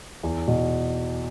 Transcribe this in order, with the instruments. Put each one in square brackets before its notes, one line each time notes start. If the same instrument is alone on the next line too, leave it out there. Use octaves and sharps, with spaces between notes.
[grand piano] E2
B2